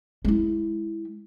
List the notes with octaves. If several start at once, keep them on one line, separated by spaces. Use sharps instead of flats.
G#3 E4